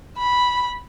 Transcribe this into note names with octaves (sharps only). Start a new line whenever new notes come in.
B5